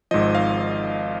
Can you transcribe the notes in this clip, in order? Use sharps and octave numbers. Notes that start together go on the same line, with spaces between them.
G#1 G#2 F3 D#5
F5